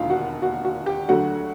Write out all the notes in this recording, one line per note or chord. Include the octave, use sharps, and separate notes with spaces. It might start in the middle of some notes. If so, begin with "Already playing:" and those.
Already playing: E1 D#2 D3 F4 F5
F#4 F#5
F#4 F#5
F#4 F#5
G4 G5
D2 D3 F#3 A3 F#4 F#5